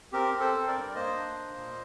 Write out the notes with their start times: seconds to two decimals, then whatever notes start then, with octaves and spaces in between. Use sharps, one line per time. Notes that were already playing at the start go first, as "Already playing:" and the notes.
0.12 C4 G4 A#4
0.34 C4
0.40 A4 C5
0.54 C4
0.67 A#4 D5
0.75 G2
0.95 A#3 C5 D#5
1.15 D4
1.36 A#3
1.56 A#2